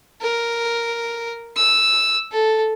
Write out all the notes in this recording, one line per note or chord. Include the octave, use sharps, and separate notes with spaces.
A#4
E6
A4